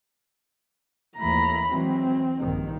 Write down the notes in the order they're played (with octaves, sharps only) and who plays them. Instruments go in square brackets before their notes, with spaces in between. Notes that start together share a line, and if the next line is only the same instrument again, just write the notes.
[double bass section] D#2 E3 A3 [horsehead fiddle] A#5 B5
[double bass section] E3 F#3 G#3 [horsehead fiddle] C4
[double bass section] A#1 G2 D#3